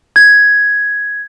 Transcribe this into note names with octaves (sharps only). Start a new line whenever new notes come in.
G#6